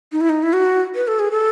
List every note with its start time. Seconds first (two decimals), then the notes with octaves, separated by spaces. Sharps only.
0.12 D#4
0.21 E4
0.29 D#4
0.43 E4
0.53 F#4
0.95 B4
1.08 A4
1.19 G#4
1.31 A4